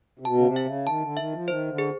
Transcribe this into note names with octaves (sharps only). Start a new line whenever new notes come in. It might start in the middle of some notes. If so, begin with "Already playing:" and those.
C3
B2 A5
C#3
C3
E5
C#3
D#3 A5
D3
D#3 E5
F3
D#3 C5
D3
G#4